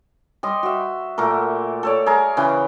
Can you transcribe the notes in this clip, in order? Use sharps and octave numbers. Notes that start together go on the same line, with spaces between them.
G3 D#5 C6
F#4 E5
A#2 A3 G4 A#4
A4 C#5 D5
G#4 A#4 A#5
C#3 E3 B4 G5